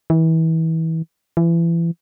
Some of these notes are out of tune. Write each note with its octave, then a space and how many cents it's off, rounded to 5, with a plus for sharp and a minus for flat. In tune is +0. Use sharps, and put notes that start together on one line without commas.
E3 -30
E3 +30